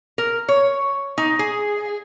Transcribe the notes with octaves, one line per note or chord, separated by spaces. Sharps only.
A#4
C#5
D#4
G#4